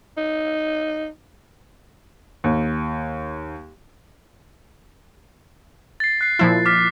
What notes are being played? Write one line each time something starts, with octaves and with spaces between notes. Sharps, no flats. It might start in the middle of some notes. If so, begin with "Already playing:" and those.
D#4
D#2
A6 C7
F#6 C7
A#2 F3 E4
D6 F6 B6